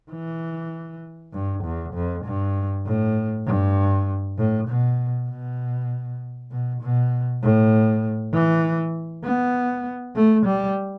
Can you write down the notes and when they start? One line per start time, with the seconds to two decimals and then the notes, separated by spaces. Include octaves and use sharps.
0.11 E3
1.33 G2
1.64 E2
1.94 F2
2.24 G2
2.86 A2
3.46 G2
4.38 A2
4.68 B2
5.29 B2
6.51 B2
6.81 B2
7.42 A2
8.33 E3
9.24 B3
10.15 A3
10.46 G3